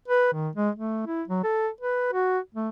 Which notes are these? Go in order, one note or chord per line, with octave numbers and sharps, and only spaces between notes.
B4
D#3
G#3
A3
E4
F#3
A4
B4
F#4
A3